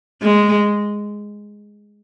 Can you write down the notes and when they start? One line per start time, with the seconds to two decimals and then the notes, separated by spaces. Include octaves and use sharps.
0.22 G#3